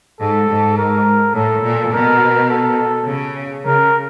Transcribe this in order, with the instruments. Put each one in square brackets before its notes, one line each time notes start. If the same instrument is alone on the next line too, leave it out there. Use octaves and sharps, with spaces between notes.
[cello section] G#2 [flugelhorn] A4
[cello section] G#2
[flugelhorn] A#4
[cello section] A2 [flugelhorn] A4
[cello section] A#2
[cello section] B2 [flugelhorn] A#4
[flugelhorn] A4
[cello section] C#3
[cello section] C#3 [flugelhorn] A#4